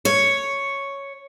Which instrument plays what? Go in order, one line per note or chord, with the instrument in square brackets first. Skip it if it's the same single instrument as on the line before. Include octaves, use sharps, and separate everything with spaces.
[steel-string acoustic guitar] C#5